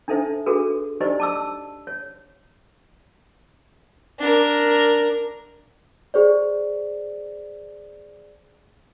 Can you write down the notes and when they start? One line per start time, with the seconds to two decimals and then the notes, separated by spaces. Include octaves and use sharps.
0.08 D4 D#4 A4 C5 E5
0.46 D4 F#4 G#4 A4 B4
1.00 D4 D#4 G4 C5 D5 D#5
1.20 A5 D6 E6
1.87 C#5
4.19 D4 A#4
6.14 G#4 C5 D5